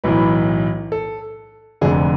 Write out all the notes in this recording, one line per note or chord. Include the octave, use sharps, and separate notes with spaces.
B1 A2 E3 B4
A4
F1 F2 D3 G#4